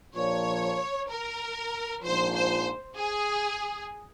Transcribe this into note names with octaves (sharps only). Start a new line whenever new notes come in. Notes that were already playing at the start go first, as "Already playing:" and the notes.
A#1 A#2 F3 C#5
A#4
A#1 G#2 F3 C5
C5
G#4